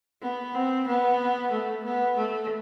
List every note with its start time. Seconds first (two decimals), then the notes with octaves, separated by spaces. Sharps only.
0.22 B3
0.55 C4
0.87 B3
1.52 A3
1.84 B3
2.17 A3